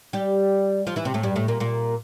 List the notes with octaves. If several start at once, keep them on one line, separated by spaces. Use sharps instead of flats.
G3 G4
F3 F4
E3 E4
C3 C4
A2 A3
G2 G3
A2 A3
A#2 A#3
A#2 A#3